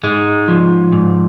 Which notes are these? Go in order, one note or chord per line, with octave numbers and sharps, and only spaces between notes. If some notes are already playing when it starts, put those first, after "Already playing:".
G#2 G#3
F3
G#2